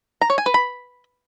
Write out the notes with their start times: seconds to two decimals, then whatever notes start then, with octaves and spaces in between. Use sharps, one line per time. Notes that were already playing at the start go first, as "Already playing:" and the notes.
0.21 A#5
0.30 C#5
0.38 G#5
0.46 B4
0.54 B5